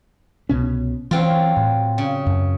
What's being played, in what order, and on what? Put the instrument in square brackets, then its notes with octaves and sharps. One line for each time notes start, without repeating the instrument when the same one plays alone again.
[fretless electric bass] C2 B2 C#4
[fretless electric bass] E3 [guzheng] F#3 C4 F4
[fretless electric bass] A2
[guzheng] C#3
[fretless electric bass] F#2